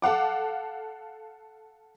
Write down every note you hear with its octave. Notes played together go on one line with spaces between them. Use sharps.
A4 F5 F#5 D6